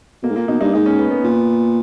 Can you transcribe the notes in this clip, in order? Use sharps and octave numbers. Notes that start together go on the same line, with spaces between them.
B2 A#3
G#2
A#2 A#3
B2 D#4
G2 D#4
G#2 D#4
C#4
B3
B3
A#2